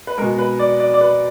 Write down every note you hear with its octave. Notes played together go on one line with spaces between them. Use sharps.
B4
B2 G#3 A#4
B4
D5
D5
D5
B4